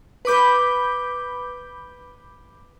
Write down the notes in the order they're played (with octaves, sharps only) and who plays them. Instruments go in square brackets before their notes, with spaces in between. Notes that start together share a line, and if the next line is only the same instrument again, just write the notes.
[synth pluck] B4 B5 D6 G6